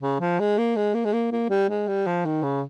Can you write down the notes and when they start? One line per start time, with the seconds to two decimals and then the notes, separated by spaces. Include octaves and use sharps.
0.02 C#3
0.20 F3
0.39 G#3
0.58 A#3
0.76 G#3
0.94 A#3
1.05 G#3
1.13 A#3
1.32 A#3
1.50 G3
1.69 G#3
1.87 G3
2.07 F3
2.25 D#3
2.43 C#3